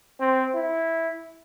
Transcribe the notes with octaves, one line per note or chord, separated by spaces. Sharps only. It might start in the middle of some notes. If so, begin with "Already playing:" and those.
C4
E4